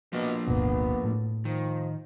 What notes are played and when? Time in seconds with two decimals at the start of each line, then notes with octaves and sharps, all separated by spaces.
0.13 B2 F3 A#3 D4
0.47 D1 G1 B2 B3
1.04 A2
1.45 D#3 F3